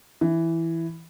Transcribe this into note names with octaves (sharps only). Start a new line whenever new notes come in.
E3